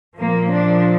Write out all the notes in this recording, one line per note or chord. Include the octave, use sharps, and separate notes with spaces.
A#2 F3 A#3
D4